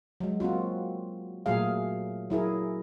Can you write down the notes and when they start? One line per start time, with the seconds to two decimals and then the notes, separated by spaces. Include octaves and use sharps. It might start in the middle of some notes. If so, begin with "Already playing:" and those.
0.20 F#3 G#3
0.40 A#3 C4 F4 F#4
1.46 A#2 F#3 A3 A#3 G#4 F5
2.30 F#3 E4 G#4 A#4